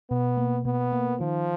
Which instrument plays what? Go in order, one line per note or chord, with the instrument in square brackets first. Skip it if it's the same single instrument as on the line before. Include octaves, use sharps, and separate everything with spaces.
[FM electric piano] B2 [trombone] B3
[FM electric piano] A#3
[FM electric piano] B2 [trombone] B3
[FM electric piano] A#3
[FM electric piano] D#3 [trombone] F3